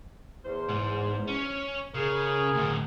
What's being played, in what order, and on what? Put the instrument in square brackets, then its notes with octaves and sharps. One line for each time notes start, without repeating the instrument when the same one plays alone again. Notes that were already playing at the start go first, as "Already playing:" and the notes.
[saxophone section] E2 C5
[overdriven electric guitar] G#2
C#4
[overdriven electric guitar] C#3 [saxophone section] G#4 A#4
[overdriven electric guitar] D2 A2